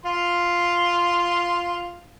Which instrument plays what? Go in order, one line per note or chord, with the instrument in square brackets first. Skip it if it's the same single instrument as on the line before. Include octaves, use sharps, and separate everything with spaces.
[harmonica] F4 C6